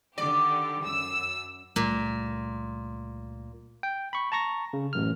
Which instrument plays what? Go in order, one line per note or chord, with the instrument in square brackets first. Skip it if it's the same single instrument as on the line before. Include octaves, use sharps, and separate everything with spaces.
[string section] D3 D#3 G4 [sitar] D5
[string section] F#2 E6
[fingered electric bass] C#2 G3 A3 [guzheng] A#2
[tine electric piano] G5
B5 C#6
A5 A#5 C#6 A#6
C#3
A1 F#2 F6